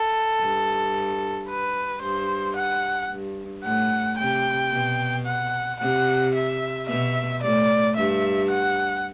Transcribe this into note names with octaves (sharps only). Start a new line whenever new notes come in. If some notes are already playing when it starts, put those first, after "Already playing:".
Already playing: A4
G2
B4
G2 C5
F#5
G2
A2 F#5
C3 G5
B2
F#5
C3 F#5
E5
B2 E5
A2 D5
G2 E5
F#5